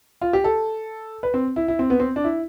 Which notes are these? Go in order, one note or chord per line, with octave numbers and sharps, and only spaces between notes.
F4
G4
A4
B4
C4
E4
E4
C4
B3
C4
D4
E4